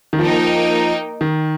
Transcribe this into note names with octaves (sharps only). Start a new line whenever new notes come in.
D#3
F3 A#3 D#4 A#4 G5
D#3